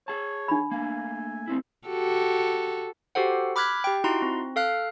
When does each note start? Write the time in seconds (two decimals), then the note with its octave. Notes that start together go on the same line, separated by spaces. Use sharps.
0.08 G#4 C#5 A5
0.48 D4 B5
0.71 A3 A#3 G#5
1.48 A3 C4 E4
1.88 F#4 G4 A4
3.15 F#4 G4 A4 C5 F#5
3.56 B5 D6 F6 F#6 G#6 B6
3.84 G4 G5
4.04 D#4 E4 F#4 A#5 C6
4.22 C4
4.56 A4 F5 F6 F#6